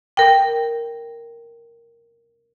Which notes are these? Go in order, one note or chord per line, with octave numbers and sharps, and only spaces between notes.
A#4 G5